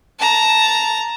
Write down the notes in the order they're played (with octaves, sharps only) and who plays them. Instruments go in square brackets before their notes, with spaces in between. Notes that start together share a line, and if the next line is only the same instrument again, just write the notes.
[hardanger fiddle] A5 A#5